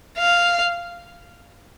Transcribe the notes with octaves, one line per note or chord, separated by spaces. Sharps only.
F5